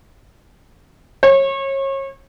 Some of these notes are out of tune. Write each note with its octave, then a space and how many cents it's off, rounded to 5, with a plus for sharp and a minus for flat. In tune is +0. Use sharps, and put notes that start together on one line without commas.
C#5 -30